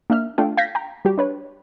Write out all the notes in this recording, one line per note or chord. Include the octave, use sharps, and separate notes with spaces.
A#3 D4 E5 F6
A3 D4 F4 A4 F5 G5
F5 G6 G#6 A#6 B6
G5 A#5
G3 F#4 G4
D4 B4 C#5